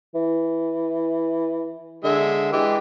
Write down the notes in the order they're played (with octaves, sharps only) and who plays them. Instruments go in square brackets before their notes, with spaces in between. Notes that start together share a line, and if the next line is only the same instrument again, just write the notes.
[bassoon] E3
[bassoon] D3 [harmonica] G#3 E5
[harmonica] E3 G4 B4 [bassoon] G#3